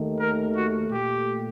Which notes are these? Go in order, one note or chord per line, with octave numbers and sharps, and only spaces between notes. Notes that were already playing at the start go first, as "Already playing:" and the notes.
Already playing: D#2 D#3 A3
A#4
F#4
A#2 A3 G4